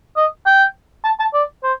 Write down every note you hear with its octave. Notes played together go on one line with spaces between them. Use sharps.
D#5
G5
A5
A5
D5
C5